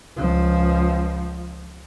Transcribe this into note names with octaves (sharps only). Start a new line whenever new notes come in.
C#2 F3